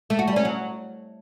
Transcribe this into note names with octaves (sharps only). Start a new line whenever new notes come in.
A3
F#4
G3
C#4
F#3